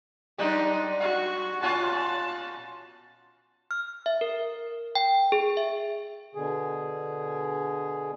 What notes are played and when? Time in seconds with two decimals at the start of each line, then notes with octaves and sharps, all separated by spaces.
0.38 F#2 D4 D#4 G4
1.00 F#4
1.63 A#2 C#4 F4 A5
3.71 F6
4.06 E5
4.21 A#4
4.95 G5
5.32 G#4
5.57 E5
6.35 B2 D3 G#4